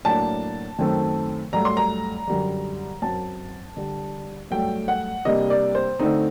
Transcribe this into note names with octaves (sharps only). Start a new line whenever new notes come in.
A2 F#3 A#3 D4 A5
F#2 D#3 A3 C4
G2 F#3 A3 A#5
C6
A#5
F#2 D3 G3
F#2 F#3 C4 A5
D3 G3 D4
G2 F#3 A3 G5
F#5
C3 G3 A#3 D4 D#5
D5
C5
D3 A3 C4 D#4